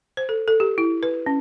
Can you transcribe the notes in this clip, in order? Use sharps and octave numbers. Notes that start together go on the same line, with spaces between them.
C5
A4
A4
G4
E4
B4
C#4